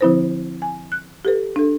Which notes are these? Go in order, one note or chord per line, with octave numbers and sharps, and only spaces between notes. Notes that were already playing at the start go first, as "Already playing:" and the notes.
D3 F3 C4 E4 B4 C5
G#5
F#6
G4 A4 B4
D4 A4